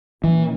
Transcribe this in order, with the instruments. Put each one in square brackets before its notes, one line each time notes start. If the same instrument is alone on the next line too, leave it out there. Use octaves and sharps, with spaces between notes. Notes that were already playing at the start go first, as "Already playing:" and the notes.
[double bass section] A#2 A#3 C#4 [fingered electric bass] E3